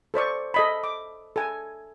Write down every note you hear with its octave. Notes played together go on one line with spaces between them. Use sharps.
A4 C5 D5 C#6
A4 D#5 B5
D6
A4 G#5